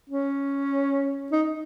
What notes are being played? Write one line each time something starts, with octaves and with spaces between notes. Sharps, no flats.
C#4
D#4